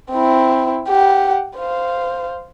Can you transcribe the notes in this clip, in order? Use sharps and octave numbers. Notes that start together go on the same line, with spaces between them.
C4 E4
G4 F#5
C5 F5